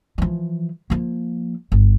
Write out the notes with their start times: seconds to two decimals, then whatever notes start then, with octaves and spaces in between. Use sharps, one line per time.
0.18 E3 F3
0.90 F3 A#3
1.72 G1